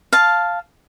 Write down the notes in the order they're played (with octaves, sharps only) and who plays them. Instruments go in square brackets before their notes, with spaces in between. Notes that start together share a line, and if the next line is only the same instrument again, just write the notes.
[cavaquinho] F5 A5